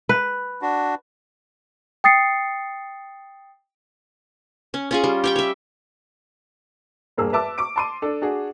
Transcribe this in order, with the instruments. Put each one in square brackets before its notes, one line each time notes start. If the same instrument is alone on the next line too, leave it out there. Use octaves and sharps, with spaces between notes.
[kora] B4
[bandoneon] D4 F#4
[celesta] G5 D#6 A6 C7 C#7
[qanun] C#4
C#4 F4 G#4
G3
G4 C#5 G5
C#5 E5
[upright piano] E1 G2 A#3 G#4 E6
B4 E5 A5 D6 E6
C#6 D6 D7
A5 C6 D#7
D4 A4
D4 F#4 G#4